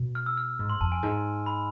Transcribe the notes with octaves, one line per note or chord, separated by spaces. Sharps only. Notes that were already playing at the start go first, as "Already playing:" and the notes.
Already playing: B2
F6
E6
F6
G#2
C6
F2 A5
G#5
G#2 A5
B5